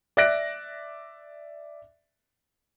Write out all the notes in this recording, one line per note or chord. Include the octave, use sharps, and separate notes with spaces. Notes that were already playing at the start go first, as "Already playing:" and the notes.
D5 E5 F#6 A#6 D7